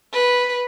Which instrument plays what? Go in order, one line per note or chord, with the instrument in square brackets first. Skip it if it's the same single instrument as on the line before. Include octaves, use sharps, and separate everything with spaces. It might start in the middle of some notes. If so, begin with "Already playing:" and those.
[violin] B4